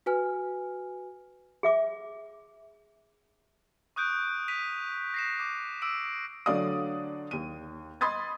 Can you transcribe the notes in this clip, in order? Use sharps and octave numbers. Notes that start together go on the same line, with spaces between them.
F#4 B4 G#5 F6
G#4 E5 D6
C#6 D#6 F#6 G6 D7
B6 D#7 F7
A#6 C7 E7
D6
D6 E6 D7
D3 F#3 A3 D5 F5 D#6
D#2 D#7
D#5 B5 C6 D#6 G#6 A6